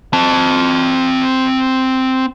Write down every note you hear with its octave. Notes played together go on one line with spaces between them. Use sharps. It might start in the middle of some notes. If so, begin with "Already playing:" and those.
C4 A5